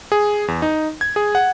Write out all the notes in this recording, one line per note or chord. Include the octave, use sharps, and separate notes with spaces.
G#4
E2
D#4
G#6
G#4
F#5